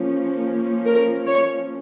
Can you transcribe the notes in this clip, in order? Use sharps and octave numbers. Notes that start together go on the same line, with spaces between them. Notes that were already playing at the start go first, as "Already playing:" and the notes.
Already playing: F3 A#3 C#4
A#4
C#5